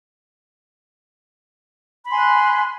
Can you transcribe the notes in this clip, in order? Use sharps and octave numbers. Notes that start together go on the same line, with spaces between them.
G#5 B5 C6 F#6